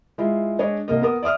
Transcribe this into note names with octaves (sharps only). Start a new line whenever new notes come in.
G#3 E4 F4
G#3 D4 C#5 D#5
C2 A#3 D#5
B3 A#4 D#6
D5 E5 D#6 F6